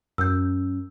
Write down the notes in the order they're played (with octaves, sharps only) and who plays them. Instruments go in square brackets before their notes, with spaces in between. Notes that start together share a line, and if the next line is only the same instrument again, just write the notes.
[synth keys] F#2 [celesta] E6 G6